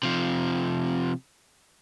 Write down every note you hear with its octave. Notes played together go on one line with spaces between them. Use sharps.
C3 F3